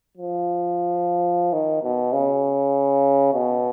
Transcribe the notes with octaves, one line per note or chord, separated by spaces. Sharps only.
F3
D#3
B2
C#3
B2